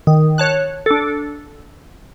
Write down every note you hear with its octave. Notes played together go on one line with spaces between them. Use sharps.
D#3
C#5 A5 F#6
D4 A4